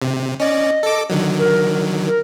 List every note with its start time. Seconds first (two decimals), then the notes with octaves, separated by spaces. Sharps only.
0.02 C3
0.40 C#4 D5 D#5
0.83 A4 D6
1.10 D3 D#3 F#3
1.39 A#4
2.07 A#4